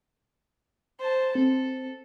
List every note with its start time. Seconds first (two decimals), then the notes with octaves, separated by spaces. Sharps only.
0.99 C5 A5
1.35 C4 A4